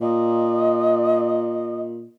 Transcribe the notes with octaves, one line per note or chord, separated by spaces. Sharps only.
A#2 D#5